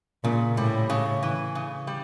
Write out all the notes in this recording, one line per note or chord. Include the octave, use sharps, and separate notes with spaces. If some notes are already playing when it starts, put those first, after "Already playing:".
A#2 C#3
A2 G3
C#3
E3
C#3
G3